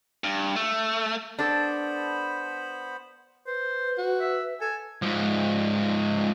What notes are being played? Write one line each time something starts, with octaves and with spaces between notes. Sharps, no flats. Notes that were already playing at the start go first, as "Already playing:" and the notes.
G2
A3
B3 D4 A4 C5 B5
B4 C5
F#4
E5
A4 G#5
G#2 F3